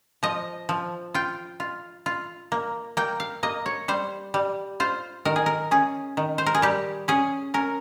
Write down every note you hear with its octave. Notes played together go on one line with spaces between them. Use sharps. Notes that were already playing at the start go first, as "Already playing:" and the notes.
F3 D#5
F3
F4 G5
F4
F4
A#3
A#3 G5
F5
A#3 D#5
C#5
G3 C5
G3
F4 C5
D#3 A#4
G#4
A#4
C#4 G#4
D#3
C5
A#4
G#4
G3 G4
C#4 G#4
C#4 A#4